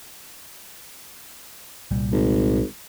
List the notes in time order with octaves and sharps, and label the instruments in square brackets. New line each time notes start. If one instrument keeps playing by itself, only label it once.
[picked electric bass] C2 A#2 G3
[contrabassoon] G#1